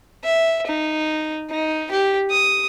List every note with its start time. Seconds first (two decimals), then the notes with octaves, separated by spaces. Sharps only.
0.24 E5
0.67 D#4
1.50 D#4
1.91 G4
2.30 D#6